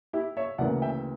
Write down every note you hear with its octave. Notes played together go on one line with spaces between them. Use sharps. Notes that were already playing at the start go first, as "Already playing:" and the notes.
E4 G4
C#5 E5
D2 C#3 E3 A#3 D5 F#5
E5 G5